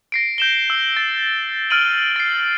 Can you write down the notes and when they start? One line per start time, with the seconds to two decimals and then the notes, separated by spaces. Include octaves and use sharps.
0.12 A#6 C7 D7
0.38 G6 E7 G7
0.70 E6
0.97 A6
1.70 E6 F6 A6 D7 D#7 F#7
2.16 A6 C7